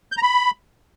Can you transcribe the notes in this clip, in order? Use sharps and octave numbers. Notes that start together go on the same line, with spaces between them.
G6
A#5
B5